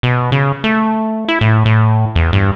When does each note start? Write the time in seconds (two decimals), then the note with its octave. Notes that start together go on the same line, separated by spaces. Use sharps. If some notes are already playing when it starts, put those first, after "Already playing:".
0.03 B2
0.32 C#3
0.64 A3
1.28 E4
1.41 A2
1.66 A2
2.15 E2
2.33 G2